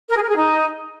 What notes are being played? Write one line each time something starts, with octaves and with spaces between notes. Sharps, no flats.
A#4
G#4
A#4
G#4
D#4